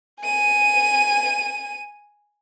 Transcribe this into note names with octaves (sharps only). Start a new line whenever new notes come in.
G#5 D#7